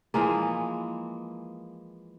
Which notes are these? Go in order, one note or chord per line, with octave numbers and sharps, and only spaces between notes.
E3 F3 G#3 A#3